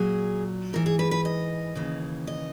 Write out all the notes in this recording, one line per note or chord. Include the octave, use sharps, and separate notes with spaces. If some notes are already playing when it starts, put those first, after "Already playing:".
Already playing: A#2 F#3 G#4
G#2 E3 A#4
G#4
B4
B4
D#5
D#2 C#3 E3
D#5